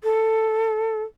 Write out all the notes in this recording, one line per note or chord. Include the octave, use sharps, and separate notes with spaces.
A4